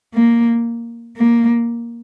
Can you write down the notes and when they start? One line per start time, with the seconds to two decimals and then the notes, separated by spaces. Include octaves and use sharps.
0.14 A#3
1.17 A#3